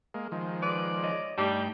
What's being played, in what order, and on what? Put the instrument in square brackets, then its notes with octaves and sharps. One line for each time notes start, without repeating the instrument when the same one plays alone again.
[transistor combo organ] G#3 A#3
D#3 F3 G#3
[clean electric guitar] B4 [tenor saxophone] D5
[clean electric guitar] C#5 D#5
[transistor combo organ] G2 D#4 G5 [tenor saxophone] G3 [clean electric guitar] A3 A5